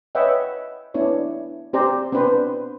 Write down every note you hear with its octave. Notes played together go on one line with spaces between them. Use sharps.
B4 C#5 D#5 E5 F#5 G5
B3 D4 E4 C#5
C4 G4 C5 D5 A#5
B3 C4 D4 B4 C5